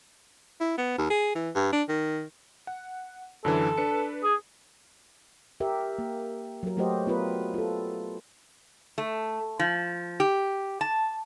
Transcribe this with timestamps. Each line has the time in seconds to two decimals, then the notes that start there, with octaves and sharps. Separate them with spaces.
0.61 E4
0.78 B3
0.98 D#2
1.10 G#4
1.35 E3
1.56 G2
1.73 D4
1.89 D#3
2.67 F#5
3.45 F#2 D3 E3 A4
3.78 D4 B4 C#7
4.24 G#4
5.60 G4 A#4 E5
5.99 A#3
6.63 F#3 A#4
6.77 F#3 A3 F#4 G4 C5 D#5
7.07 B3 F4 A#4 B4
7.54 F4 A4
8.98 A3
9.59 F3
10.20 G4
10.81 A5